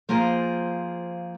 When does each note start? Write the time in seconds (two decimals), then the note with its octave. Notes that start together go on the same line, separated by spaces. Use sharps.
0.09 F3 A#3 F4 G#4 C5